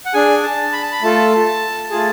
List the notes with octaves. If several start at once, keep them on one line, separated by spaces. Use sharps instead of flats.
F#5
D4 G#4 G#5
A5
B5
A5
B5
A3 F4 A4 A5
A3 F4 G#4